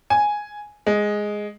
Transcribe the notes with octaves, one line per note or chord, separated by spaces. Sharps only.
G#5
G#3